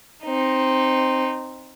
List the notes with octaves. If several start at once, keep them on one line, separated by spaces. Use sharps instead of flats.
C4 D#4